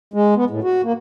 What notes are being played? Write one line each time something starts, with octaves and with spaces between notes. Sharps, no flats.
G#3
B3
A2
F#4
A#3